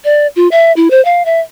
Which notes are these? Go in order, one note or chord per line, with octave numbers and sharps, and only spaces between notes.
D5
F4
E5
E4
C5
F5
E5